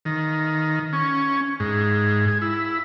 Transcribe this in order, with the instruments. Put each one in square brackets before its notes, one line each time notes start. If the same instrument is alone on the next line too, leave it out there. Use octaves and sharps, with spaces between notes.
[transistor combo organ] D#3
C#4
G#2
G#4
E4